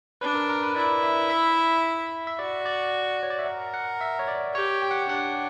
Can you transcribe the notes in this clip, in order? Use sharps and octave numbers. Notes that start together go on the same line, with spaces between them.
D4 B4
A#4
A#4
B4
E4 D5
E5
E5
E5
F#4 D5
D5
C#5
D5
E5
A#4 F#5
F#5
E5
C#5
D5
G4 C#5
G5
F#5
D4 F#5